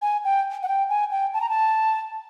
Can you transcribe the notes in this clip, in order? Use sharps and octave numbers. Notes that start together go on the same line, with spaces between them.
G#5
G5
F#5
G5
G#5
G5
A5
A#5
A5